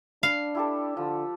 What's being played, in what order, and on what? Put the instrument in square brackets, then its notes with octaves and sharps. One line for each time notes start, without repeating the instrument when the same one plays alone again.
[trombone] D4 [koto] F5 [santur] B5
[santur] E4 G4 A4
[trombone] D3 [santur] F3